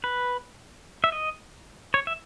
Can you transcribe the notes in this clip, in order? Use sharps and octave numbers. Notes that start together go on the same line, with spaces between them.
B4
E5
D#5
C#5
E5